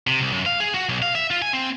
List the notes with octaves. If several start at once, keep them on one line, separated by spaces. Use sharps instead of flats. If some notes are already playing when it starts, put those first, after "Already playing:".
C3
C2
F#2
F5
G#4
F#4
B1
F5
E5
F4
G#5
C4